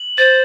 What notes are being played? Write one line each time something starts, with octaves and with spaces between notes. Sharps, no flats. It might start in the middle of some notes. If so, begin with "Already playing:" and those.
Already playing: F#7
C5 A6